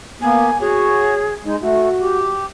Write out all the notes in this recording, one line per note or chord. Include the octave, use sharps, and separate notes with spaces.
A#3 B3 G#5
F#4 G#4 C#5
G#3 D#4
A3 F#4
G4